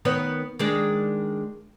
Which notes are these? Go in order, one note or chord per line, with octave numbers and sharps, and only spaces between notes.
D#3 B3 C#5
D#3 G#3 D4